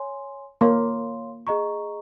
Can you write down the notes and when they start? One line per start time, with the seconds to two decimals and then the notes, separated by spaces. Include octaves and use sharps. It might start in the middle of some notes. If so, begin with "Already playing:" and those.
Already playing: C#5 G#5 C6
0.61 A#3 C#5 F5 C6
1.47 G#4 D#5 A#5 C#6